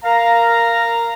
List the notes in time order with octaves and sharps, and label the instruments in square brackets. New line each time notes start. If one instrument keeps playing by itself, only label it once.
[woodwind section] A#4 F5 A#5